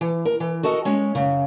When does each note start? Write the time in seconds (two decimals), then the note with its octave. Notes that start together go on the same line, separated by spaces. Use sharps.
0.01 E3
0.25 A#4
0.40 E3
0.63 F#4 A4 A#4 D#5
0.85 G#3 C#4
1.15 F#2 C#3